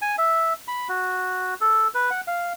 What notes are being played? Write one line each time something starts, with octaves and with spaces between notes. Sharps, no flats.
G#5
E5
B5
F#4
A4
B4
F#5
F5